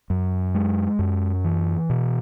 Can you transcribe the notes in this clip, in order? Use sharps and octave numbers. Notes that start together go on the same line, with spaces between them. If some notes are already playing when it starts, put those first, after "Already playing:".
F#2
G#3
F#2
E3
B2